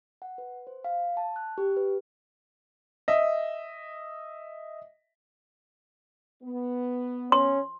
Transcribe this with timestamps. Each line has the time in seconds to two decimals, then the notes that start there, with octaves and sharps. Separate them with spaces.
0.22 F#5
0.38 B4
0.67 C5
0.84 F5
1.17 A5
1.36 F#6
1.58 G4
1.77 B4
3.08 D#5 E5
6.43 B3
7.32 C#4 C6